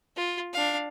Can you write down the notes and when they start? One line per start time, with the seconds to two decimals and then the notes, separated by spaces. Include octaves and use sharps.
0.16 F4
0.53 D4 F5